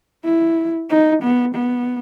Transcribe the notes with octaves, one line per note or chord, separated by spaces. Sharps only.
E4
D#4
B3
B3